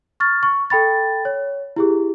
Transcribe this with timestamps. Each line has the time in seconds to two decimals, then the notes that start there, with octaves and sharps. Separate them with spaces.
0.20 C#6 F6 A6
0.43 C#6
0.70 A4 G5 B5 A6
1.25 C#5
1.76 E4 G4 G#4